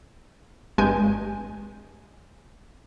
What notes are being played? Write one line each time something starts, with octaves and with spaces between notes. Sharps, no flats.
G#1 G2 G#3 G#5 G6